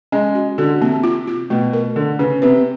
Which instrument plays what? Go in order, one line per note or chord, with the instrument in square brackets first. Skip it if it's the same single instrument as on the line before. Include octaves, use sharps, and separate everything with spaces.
[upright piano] G#3 [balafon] C#4
[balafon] F#4
[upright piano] D3 [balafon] F#4
[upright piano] C3 [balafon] A#3
[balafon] F4
F4
[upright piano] B2 [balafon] A3
[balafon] A#4
[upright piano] D3 [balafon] D4
[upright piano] C#3 [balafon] B4
[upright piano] C3 [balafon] B4